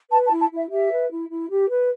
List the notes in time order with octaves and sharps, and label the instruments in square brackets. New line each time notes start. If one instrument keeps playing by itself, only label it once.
[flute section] B4 A5
A5
E4
A5
E4 E5
G4 E5
B4
E4
E4
G4
B4